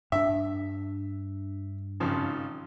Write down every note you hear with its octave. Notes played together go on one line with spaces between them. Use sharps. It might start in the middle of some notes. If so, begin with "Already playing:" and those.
G2 D4 E5
G#1 C#3 F3